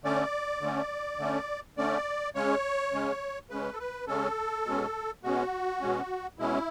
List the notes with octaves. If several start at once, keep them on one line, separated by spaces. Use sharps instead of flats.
D3 A3 C#4 D5
D3 A3 C#4
D3 A3 C#4
D3 A3 C#4 D5
C#3 G#3 C#4 C#5
C#3 G#3 C#4
C#3 G#3 C#4 B4
A4
B4
C#3 G#3 C#4 A4
B2 G#3 C#4
B2 G#3 C#4 F#4
B2 G#3 C#4
B2 G#3 C#4 E4